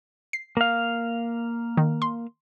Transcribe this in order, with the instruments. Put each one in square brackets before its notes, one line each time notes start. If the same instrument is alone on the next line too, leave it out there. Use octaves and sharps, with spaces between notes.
[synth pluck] C7
[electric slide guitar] A#3 F5
[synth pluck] D#3
C6